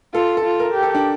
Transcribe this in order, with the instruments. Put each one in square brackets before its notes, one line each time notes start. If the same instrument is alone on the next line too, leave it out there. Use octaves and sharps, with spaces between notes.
[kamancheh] F4 [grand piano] A4
[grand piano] A4
[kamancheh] F4
[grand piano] A#4
[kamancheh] G4
[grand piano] A4
D4